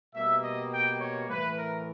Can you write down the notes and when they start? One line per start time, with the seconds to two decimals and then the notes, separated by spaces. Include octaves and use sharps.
0.14 B2 G3 A#3 E5
0.44 D#5
0.72 G5
1.01 C#5
1.29 A2 E3 A3 B4
1.58 A#4